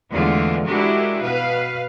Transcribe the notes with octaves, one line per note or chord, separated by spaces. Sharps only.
E2 D3 E3 G#3 A3 F4
G#3 D4 E4 F#4 G4 A#4
B2 B4 F5